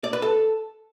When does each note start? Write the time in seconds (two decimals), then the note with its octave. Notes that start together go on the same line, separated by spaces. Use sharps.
0.04 D5
0.13 B4
0.22 A4